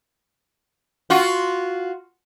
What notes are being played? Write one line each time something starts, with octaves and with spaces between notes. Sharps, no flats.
F4 F#4